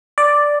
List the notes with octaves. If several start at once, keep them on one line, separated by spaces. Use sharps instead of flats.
D5